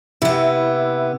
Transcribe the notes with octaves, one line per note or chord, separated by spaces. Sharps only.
C3 B3 E4